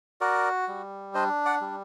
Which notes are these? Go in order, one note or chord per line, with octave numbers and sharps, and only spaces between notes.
F#4 A#4 D5
G3
D4 C5 D#5
D5 F#5
G3